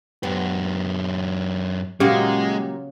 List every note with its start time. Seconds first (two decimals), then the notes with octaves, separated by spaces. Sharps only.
0.23 F#2 B3 G4
2.00 A#2 C#3 F#3 G#3 F#4 G4